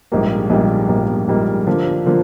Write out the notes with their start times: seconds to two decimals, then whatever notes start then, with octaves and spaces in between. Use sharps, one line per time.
0.12 A#1 G#2 G3 A#3
0.50 A#1 G#2 G3 A#3
0.89 A#1 G#2 G3 A#3
1.28 A#1 G#2 G3 A#3
1.67 D3 F3 A#3 D4
2.06 D3 F3 A#3